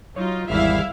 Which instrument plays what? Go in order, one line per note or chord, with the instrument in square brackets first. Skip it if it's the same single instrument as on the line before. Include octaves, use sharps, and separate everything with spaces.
[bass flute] F#3 [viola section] D#4 F4 [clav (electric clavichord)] C#5
[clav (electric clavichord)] G#1 E2 [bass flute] G3 [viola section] E4 E5 F5